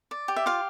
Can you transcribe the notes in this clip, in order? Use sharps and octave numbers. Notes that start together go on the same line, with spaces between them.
D5
G4
E5
F4 F5